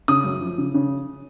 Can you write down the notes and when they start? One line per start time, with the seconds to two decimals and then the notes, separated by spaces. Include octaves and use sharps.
0.08 C#3 D#6
0.24 F#2
0.41 F3
0.58 C#3
0.74 C#3